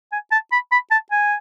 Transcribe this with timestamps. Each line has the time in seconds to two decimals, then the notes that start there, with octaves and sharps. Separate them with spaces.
0.12 G#5
0.32 A5
0.52 B5
0.72 B5
0.91 A5
1.11 G#5